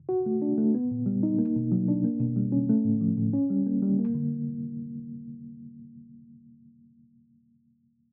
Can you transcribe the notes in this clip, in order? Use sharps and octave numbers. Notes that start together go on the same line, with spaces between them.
F#4
A3
D4
A3
B3
A#2
G3
D#4
A#3
B2
F#3
D4
A#3
B2
G3
C#4
A3
A2
F3
A2
C#4
G3
A#3
G3
A#3
D3